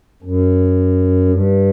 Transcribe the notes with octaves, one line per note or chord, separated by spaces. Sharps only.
F#2
G2